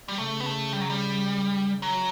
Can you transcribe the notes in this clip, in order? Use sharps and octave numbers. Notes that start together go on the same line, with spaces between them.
G3
C#3 A3
B3
A3
G3
F#3
G3
F#3